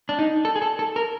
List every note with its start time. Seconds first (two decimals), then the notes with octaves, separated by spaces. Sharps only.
0.09 D4
0.19 D#4
0.45 A4
0.56 G#4
0.62 A4
0.79 A4
0.96 A#4